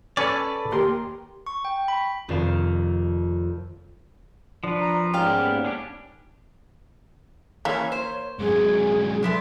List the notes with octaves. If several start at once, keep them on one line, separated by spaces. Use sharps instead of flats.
C#4 A4 B4 D5 G#5
D#2 G4 A#4 C6
C#6
G5
B5
F1 F2 D#3 D5 F5 E7
F3 D4 B4
A#5
G#2 G3 C#4 G4 F5
A#3 B3
C#4 D4 G4
E3 A#3 C#4 C#5
C5
G#2 F#3 G#4
A3 B3 D4 C6